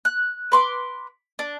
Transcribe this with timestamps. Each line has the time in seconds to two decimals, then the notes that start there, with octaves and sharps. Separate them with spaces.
0.05 F#6
0.52 B4 C6 D6
1.39 D4